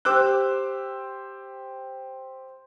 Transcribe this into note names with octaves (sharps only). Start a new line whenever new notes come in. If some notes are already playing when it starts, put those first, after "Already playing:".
G4 C5 D6 E6 F#6